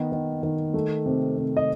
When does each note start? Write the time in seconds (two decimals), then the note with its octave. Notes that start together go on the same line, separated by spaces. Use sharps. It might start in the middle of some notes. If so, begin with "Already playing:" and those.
Already playing: D#3 B3
0.12 D#3
0.43 D#3
0.74 A3
1.06 C3
1.38 C3
1.57 D#5